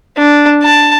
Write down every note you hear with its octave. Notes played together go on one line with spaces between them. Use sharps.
D4
A5